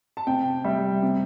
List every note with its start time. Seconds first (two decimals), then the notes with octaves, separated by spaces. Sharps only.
0.17 A5
0.27 C3 G5
0.64 G3 E5
1.03 C3